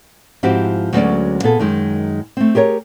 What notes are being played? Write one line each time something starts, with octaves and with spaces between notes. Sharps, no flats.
G#2 F3 C4 E4 F#4 G4
D2 F#3 G#3 B3 C#4 D5
A#2 B3 G#4 A4
F#2 D#3 G#3
A3 C4
G4 G#4 A#4 C#5